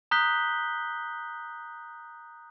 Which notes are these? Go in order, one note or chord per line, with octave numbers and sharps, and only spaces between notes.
A#5 D#6 F#6 G6 B6 G7